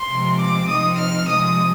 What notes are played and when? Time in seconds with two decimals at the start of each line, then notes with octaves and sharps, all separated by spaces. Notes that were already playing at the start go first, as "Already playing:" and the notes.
Already playing: C6
0.11 C3 F3 G#3 C4
0.41 D6
0.69 C3 F3 C4 D#4 D#6
0.99 F6
1.28 C3 F3 G#3 D#6